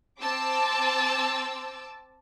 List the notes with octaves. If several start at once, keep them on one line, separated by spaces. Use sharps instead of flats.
C4 A5 D6 E6